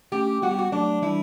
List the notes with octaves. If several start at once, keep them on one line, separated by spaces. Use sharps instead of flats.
A3 C#4 G4
G3 B3 F#4
G4
F#4
F#3 A3 D4
E3 G3 E4